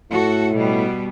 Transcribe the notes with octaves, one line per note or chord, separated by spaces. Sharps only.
A2 F#4 A4
B2 G3